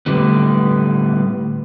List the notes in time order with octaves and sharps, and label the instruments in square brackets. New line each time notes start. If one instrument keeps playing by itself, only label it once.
[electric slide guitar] A2 D3 G3 B3